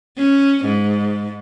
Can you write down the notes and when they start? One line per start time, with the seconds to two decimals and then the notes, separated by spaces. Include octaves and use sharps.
0.17 C#4
0.66 G#2